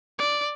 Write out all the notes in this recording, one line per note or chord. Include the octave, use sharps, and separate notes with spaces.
D5